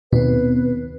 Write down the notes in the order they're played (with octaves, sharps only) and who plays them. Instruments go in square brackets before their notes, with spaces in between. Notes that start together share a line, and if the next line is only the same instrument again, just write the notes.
[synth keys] D#2 [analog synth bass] B2 [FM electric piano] B3 C4 [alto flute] B4